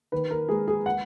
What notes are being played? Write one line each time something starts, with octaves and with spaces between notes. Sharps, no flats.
D#3 B4
A#4
G#3 G#4
G#4
F#5